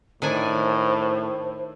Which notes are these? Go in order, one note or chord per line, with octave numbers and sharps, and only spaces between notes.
A2 D#3 D4 C5 G#5